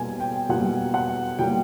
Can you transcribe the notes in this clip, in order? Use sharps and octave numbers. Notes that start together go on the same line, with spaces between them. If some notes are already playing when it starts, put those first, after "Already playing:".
Already playing: B2 G3 A#3 G#5
G5
B2 G3 A#3 F#5
F#5
B2 G3 A#3 G5